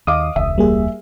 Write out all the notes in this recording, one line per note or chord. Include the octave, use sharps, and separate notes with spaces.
D#2 D#5 F5 D6 D#6
E1 C#2 E5
G3 A#3 G#4